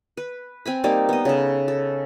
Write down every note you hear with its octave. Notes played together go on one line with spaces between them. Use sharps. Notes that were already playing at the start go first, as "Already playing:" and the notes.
B4
C4 G#5 B5
G3 A#3 D#4 D5
B3 D#5
C#3 A4
A4